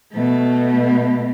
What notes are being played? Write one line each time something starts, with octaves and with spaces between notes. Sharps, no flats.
B2 A3